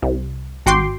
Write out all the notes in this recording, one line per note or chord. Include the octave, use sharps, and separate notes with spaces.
C2
G#1 F#4 G5 C6 D6